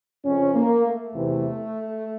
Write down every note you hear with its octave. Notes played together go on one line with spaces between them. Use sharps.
F2 C#3 F3 C#4
A#3
A3
E2 C3 E3